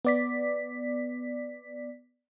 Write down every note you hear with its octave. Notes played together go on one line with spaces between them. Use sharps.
B3 D5 B6